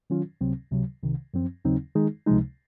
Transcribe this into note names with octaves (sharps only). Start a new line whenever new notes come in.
D#3 F#3 C#4 F4
C#2 C3 F#3 C4
C#2 C3 F#3
C2 C3 D#3
F#2 F3 C4
D#2 C#3 F#3 C4 D#4
D#3 G#3 D#4 G#4
C#2 C3 F3 G#3 D#4